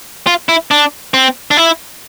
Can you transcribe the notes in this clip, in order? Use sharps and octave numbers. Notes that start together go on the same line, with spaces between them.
F4
E4
D4
C4
D4
E4